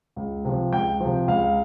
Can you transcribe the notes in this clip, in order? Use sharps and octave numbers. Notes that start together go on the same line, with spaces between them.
C#2
C3 F3
C#2 G5
C3 F3
C#2 F5